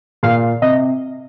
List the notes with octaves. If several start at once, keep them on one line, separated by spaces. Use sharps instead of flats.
A#2 F5
C3 D#5